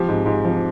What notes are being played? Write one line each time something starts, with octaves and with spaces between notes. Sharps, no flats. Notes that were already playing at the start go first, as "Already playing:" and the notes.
Already playing: F3 G4
G#2
G#2
F3